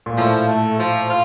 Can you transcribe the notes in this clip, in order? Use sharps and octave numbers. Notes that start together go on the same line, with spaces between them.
A#2
A2 F3
A3
F3
F4